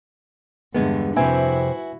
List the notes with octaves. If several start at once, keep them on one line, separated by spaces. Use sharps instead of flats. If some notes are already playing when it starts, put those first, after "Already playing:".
E2 G2 D3 G#3 B3
F2 C3 C4 E4 F#4 B4 E5 G#5